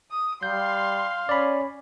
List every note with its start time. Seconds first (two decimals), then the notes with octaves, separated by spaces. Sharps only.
0.11 D#6
0.43 G3 F5 C6 G6
1.29 C#4 D5 B5